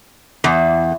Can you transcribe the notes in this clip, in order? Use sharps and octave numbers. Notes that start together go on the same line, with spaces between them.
E2